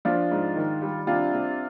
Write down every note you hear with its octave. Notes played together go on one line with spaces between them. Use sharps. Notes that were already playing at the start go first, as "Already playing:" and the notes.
F3 D4 F4
G#2
D#3
G3
C3 D4 F4
C3